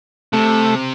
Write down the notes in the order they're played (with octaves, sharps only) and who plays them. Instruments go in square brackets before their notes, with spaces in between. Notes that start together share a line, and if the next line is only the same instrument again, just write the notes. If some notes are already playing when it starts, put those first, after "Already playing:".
[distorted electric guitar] C3 [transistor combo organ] A3